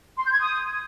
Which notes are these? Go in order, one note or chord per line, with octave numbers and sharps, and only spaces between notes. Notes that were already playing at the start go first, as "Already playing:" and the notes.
C6
G6
G#6
D#6